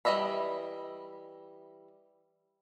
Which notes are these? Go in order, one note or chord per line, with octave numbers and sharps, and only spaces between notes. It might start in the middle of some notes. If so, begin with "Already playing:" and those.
E3 G3 D#5 E5 B5